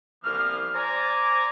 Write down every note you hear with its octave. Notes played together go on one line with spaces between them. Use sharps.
C2 E3 F3 A#3 B3 F6
C5 D5 G#5 A#5